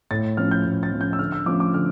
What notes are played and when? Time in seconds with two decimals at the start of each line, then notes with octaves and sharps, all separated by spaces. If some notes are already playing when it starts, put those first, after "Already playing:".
0.11 A2 A6
0.37 F3 C#4 F6
0.51 G6
0.65 A2
0.83 A6
0.92 F3 C#4
1.01 G6
1.13 E6
1.19 D3 F6
1.32 E6
1.46 F3 A3 C#4 D6
1.60 D6
1.73 D3 F6